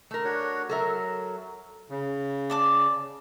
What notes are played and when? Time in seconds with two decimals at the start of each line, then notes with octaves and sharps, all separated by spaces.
0.11 A3 A#4
0.24 D4 F#4 C#5
0.70 F#3 A4 A#4 E5
1.90 C#3
2.50 D5 A5 D6